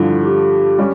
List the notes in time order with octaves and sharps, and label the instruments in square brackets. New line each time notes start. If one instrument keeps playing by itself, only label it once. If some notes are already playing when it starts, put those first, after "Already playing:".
Already playing: [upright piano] G2 D3 F3 [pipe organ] E4
[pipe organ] G4
[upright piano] G3 C#4